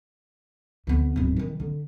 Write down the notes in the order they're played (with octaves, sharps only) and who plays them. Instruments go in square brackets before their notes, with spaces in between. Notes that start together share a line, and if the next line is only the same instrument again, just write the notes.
[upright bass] D2 B3
D1 G#1
D#3 E3
D3